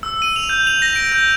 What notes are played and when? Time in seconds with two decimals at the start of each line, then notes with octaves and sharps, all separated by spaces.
0.03 E6
0.22 D#7
0.36 F7
0.49 G6
0.67 F7
0.82 A#6
0.96 D7
1.12 G6